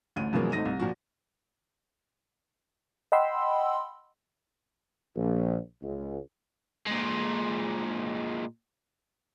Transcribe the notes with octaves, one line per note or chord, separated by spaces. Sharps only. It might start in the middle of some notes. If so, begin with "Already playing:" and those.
A1 D2 D#7
F#2 B2 E3 F3 G#3 A#3
G#1 A3 D#4 A#6 D#7
C2
A#2 F3 F#4
D#5 F#5 G5 B5 C6 E6
A#1
C#2
A#2 G#3